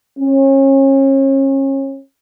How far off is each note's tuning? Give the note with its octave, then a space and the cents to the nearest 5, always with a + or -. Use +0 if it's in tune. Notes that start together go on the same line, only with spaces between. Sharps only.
C#4 -35